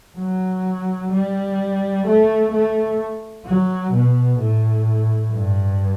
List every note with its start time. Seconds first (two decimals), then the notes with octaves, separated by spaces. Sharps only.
0.18 F#3
1.12 G3
2.06 A3
2.51 A3
3.45 F#3
3.92 B2
4.40 A2
5.32 G2